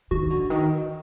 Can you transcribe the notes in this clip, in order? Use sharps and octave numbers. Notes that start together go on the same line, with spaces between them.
D#3 F#4
D3
D#3